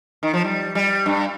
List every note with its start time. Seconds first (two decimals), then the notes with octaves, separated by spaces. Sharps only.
0.23 D#3
0.34 F3
0.44 G3
0.75 G3
1.06 G2